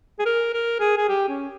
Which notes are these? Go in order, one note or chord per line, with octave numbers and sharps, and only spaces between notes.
G#4
A#4
A#4
G#4
G#4
G4
C#4